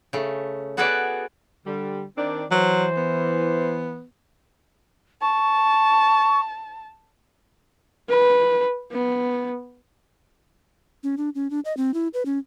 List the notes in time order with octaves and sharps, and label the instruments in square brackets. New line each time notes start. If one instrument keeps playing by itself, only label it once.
[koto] C#3 A3
B3 F#4 G#4 A4 B4 D5
[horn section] D3 G3
D#3 C4 D4
[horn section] E3 [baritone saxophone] F#3 [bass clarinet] C5
[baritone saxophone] B3
[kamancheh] A5 [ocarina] C#6
[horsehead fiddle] B4
B3
[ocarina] C#4
D4
C#4
D4
D#5
C4
E4
B4
C#4